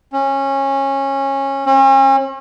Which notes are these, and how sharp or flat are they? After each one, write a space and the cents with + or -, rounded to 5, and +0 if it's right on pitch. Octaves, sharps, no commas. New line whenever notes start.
C#4 -20
C#4 -40